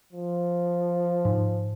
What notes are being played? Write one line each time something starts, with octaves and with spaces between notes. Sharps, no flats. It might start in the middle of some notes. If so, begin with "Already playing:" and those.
F3
G#2